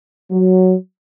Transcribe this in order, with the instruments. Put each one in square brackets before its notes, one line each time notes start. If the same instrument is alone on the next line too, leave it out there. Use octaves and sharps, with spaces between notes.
[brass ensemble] F#3